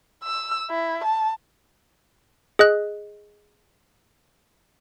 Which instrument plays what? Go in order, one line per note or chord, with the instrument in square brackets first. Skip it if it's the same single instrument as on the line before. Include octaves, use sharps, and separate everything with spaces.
[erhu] E6
E4
A5
[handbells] G#4 D#5 F#6